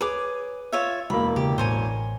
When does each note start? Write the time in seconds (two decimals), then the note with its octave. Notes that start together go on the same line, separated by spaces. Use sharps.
0.01 G#4 B4 C#5 D6
0.72 F4 C#5 E5
1.10 E1 A#3 B5
1.36 C#3 G4
1.58 A1 A2 C5 C#5 G#5